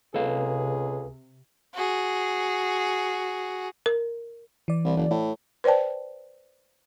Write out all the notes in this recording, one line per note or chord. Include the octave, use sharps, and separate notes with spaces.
C#2 C3 G#4 A4 B4 F5
F#4 G#4
A#4
E3 D5
C2
F#1
A2
B4 C5 D5 G5 A5